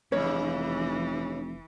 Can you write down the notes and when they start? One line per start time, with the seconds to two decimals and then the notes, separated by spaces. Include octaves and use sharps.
0.12 F1 G2 C#3 E3 C#5